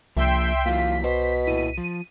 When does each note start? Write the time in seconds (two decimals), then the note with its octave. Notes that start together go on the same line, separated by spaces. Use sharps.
0.17 C2 F3 A#3 E5 G5 C6
0.66 E3 F#3 A#3 F4 B6
1.04 B2 C5
1.47 A#2 E4 D#7
1.77 F3